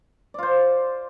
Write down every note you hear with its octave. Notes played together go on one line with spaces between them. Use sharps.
F4 C5 D5